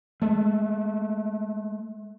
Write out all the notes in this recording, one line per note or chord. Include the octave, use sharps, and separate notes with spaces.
G#3 A3